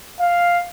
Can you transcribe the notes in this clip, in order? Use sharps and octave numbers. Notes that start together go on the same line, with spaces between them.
F5